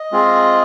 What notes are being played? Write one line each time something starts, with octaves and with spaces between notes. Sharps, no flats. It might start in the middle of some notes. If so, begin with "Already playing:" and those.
Already playing: D#5
G#3 C4 F4 G#4